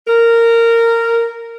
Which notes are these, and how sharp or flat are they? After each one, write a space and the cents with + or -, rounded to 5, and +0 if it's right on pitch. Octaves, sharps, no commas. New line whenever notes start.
A#4 -15